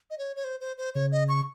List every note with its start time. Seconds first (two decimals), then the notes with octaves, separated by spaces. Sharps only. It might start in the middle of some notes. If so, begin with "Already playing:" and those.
0.10 D#5
0.18 C#5
0.36 C#5
0.44 C5
0.61 C5
0.78 C5
0.94 C#3 C#5
1.12 D#5
1.28 C#6